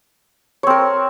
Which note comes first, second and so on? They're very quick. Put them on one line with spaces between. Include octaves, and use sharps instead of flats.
C#5 C4 A#4